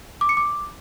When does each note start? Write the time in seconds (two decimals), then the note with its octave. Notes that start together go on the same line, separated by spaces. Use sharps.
0.21 D6
0.29 C#7
0.37 D6